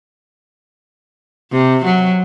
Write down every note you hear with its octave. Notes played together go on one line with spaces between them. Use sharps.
C3
F#3